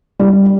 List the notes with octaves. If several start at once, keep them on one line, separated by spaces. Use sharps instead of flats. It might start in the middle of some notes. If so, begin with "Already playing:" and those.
G3